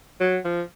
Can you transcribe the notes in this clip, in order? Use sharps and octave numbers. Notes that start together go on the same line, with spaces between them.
F#3
F3